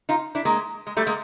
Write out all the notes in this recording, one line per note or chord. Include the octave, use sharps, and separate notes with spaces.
D#4 F4
D4 E4
G#3 A#3
G#3
G3 A3
G#3 A#3